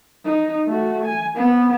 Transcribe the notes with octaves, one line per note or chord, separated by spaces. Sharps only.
D#4
A3 F#4
G#5
B3 C4